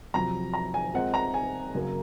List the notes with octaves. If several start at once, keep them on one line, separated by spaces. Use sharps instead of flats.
F2 C3 F#3 A#5
A#5
G#5
A#2 G#3 C4 F#5
A#5
G#5
F#2 C#3 F#3 A#3